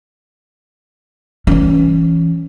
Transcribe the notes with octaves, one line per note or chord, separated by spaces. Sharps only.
E3 C#4